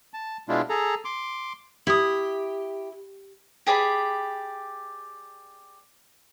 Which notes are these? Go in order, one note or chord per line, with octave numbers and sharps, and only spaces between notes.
A5
B2 G#3 D4 E4 F4
G#4 A4 A#5
C6 D6
E4 G4 D#6
G4 G#4 D5 B5